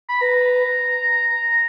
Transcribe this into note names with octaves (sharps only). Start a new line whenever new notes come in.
B5
B4 A#5